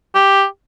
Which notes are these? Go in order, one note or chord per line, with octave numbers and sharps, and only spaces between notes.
G4